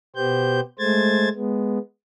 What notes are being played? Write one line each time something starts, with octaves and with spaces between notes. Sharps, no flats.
B2 B3 G4 C5 G6
G#3 A3 C5 G#6 A6
G#3 B3